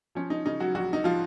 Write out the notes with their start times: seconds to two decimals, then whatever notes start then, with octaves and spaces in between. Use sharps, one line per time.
0.15 F3 C#4
0.30 D#4
0.46 C#3 D#4
0.60 F#3 F#4
0.75 A#1 F#3 F#4
0.93 D#4
1.04 F3 F4